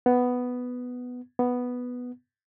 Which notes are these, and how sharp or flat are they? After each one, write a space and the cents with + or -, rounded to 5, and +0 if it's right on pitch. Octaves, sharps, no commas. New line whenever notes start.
B3 +5
B3 +0